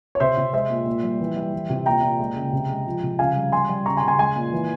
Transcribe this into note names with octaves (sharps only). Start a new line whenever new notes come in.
C#5
C3 C5 E5
C3
G#3 C5 E5
A#2
A#2
G3
E3
G3
E3
C3
A#2 G5 A#5
A#2
G#3
C#3
C3
G#3
F3
C3
C#3 F5 G#5
G3
G3 G#5 C6
G3
C#3 A#5 C#6
G#5 C6
C#3
G#5 C6
G#3 G#5 C6
A#2
E3